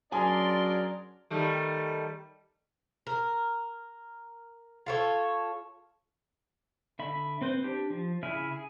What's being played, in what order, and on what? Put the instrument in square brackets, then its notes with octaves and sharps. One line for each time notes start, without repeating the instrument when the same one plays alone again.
[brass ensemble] F#3 C#4 D5 [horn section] D4 G#4 A#4 [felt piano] G#5 [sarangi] C6
[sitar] D#3 G3 A3
[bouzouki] A#4
F4 A4 C#5
[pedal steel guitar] D3 E5 B5
C4 B4 C5
D4 G4
F3
C#3 E4 G#4 E5 F6
G#4